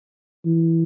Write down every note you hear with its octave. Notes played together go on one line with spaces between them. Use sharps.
E3